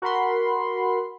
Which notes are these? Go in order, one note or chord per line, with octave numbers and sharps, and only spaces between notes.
F#4 A#4 F#5 B5 C6